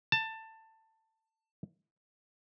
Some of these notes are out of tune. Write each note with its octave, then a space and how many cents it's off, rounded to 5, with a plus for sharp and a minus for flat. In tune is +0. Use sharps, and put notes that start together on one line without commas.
A5 +15